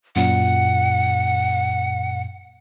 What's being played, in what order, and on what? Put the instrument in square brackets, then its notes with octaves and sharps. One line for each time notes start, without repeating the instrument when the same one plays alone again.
[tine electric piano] F#2 A#2 [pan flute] F#5